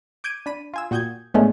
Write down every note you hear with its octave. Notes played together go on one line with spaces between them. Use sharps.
D6 G6 G#6 D7 D#7
D4 B5 D#7
F4 G#5 E6
A#2 F#4 G5 D#6 G6 G#6
A2 G#3 A3 B3 C#4 D4